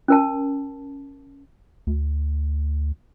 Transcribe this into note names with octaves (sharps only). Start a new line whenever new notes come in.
C#4 A#4 A5
D2